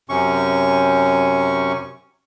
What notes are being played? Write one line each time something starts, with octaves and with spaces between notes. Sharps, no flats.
F#2 C3 C#4 C#6